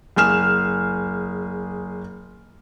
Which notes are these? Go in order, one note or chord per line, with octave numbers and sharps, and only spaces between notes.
F#1 G#4 F6 E7